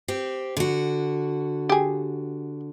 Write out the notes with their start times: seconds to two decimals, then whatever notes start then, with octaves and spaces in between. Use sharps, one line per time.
0.08 C4 G4
0.57 D3 F#4
1.69 G4 G#4